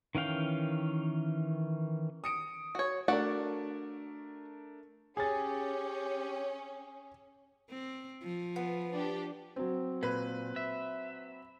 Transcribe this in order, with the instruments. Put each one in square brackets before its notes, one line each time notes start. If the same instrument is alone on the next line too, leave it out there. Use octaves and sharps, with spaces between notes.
[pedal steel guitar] D#3 E3 C#4 F5 G5
[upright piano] D#6 C#7 D7
[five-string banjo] F#4 C#5
[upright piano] A3 D4 A#4 [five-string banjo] F#4 D5 F#5
[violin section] C#4 [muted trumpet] G4 [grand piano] G#4 A6
[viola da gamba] C4
F3
[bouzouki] B3
[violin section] D4 G4
[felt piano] F#3 C4
[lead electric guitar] A#2 [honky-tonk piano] B4
[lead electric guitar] E5